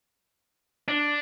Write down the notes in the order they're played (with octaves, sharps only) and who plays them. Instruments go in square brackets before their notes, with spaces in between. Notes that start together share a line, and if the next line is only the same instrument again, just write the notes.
[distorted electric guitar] D4